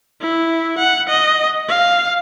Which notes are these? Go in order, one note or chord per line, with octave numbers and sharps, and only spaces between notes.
E4
F#5
D#5
F5